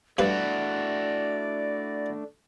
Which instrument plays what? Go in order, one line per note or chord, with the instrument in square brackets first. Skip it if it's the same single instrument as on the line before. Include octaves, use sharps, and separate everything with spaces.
[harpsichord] G2 B4 [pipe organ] A3 D4 [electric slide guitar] E4 F#4 [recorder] D5